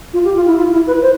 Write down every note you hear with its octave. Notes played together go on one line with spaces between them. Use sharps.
F4
G4
F4
E4
F4
E4
B4
C5